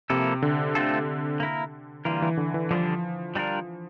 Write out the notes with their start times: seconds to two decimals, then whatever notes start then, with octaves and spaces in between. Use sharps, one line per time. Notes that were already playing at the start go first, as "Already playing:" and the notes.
0.10 C3 F3 A#3 E4 A4
0.42 D3
0.75 A3 C4 F4 A4
1.40 A#3 E4 A#4
2.05 D3 E3 G3 A#3 F4 A#4
2.22 E3
2.37 D3
2.54 E3
2.71 D3 F3 G3 D4
3.35 G3 D4 F4 A#4